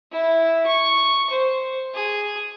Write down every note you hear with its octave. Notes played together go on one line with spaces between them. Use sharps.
E4
C#6
C5
G#4